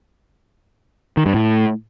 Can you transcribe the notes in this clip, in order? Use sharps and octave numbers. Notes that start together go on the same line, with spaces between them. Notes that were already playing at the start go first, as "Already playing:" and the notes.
D#3
G2
A2